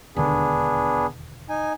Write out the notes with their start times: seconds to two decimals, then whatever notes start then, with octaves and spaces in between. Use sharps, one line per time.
0.16 E1 D#2 D3 B3 D4 G#4
1.49 D#4 G#5